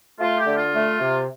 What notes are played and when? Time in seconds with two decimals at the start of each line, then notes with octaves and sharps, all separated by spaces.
0.19 A3 F4
0.38 G4
0.46 D3
0.56 F4
0.73 A3
1.00 C3